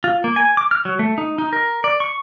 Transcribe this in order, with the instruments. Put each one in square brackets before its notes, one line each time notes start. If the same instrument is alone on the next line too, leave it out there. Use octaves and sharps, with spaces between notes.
[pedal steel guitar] F4
A#3
G#5
D6
F6
F#3
A3
D#4
D#4
A#4
D5
C#6